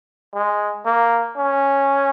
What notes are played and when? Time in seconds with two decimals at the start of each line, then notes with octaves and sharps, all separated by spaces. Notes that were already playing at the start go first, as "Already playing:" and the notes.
0.35 G#3
0.85 A#3
1.37 C#4